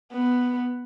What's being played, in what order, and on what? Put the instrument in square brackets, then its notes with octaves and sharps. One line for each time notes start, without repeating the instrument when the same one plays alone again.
[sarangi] B3